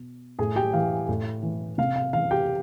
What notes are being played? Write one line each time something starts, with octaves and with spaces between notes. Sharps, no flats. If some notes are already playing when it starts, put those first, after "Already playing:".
Already playing: B2
A2 G#4 G#5
G4 G5
E3 F5
A2
E3
C3 F5
F5
E3 F5
G4 G5